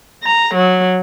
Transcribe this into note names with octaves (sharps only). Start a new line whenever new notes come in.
A#5
F#3